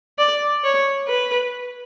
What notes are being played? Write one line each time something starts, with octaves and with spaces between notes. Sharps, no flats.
D5
C#5
B4